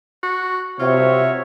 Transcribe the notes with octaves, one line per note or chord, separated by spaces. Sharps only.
F#4
C3 F4 F#4 C#5 E5